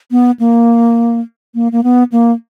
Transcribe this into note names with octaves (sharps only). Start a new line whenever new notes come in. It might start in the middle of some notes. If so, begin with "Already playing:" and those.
B3
A#3
A#3
A#3
B3
A#3